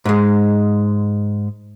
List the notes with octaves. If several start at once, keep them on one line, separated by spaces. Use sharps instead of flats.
G#2 G#3